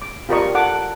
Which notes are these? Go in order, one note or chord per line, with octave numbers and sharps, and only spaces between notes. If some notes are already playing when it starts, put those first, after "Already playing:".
D6
F4 G4 A#4 D5 D#5 C#6
A4 F#5 D6